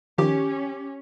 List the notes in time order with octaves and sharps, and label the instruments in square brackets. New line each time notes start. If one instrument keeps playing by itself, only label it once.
[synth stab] D#3 F3 [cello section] C#4 [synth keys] G4